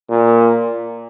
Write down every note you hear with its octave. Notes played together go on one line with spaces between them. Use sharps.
A#2